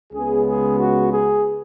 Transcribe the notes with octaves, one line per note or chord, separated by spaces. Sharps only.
C#2 C#3 G#3 B3 G#4
G#4
F#4
G#4